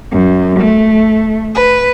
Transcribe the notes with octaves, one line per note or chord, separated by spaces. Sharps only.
F#2
A3
B4